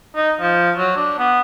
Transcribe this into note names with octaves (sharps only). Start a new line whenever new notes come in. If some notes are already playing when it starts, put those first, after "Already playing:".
D#4
F3
F#3
D4
B3